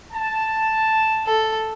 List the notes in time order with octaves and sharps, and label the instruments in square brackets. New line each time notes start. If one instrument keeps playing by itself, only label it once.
[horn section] A5
[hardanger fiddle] A4